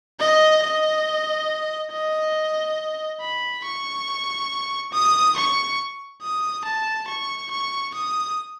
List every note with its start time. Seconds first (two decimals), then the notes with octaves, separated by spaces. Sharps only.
0.20 D#5
0.62 D#5
1.91 D#5
3.21 B5
3.64 C#6
4.92 D#6
5.36 C#6
6.22 D#6
6.64 A5
7.07 C#6
7.50 C#6
7.94 D#6